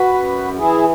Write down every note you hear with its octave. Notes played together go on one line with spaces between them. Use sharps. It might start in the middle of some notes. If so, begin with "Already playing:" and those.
Already playing: F#4 B4
F#2
E3 E4 G#4